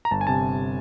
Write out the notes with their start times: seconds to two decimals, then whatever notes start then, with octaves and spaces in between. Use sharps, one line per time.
0.05 A#5
0.11 G1 A5
0.21 G#5
0.27 C3 A5